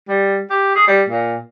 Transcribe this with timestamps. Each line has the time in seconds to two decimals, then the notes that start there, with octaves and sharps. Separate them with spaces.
0.08 G3
0.50 G4
0.76 G#4
0.88 G3
1.09 A#2